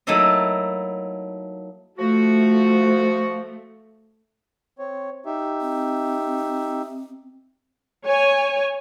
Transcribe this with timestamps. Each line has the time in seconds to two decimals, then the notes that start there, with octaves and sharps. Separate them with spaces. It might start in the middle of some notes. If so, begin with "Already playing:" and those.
0.07 F#3 A3 A#3 D#4 E4 D#5
1.99 F3 A3 F#4
4.79 C4 C#5
5.26 D#4 G4 E5
5.61 C4
8.06 C#5 G#5